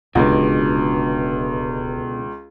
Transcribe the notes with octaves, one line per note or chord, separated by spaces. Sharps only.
D1 C#2 B2 D3